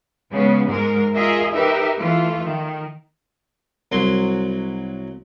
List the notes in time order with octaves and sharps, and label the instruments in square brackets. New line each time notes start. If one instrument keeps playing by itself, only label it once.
[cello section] C#3 G#3 B3
G#2 G#3 A#4
F4 G#4 A#4 D#5 E5
D#4 G4 A#4 B4 E5
E3 A3 F4
D#3
[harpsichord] C2 F#3 C6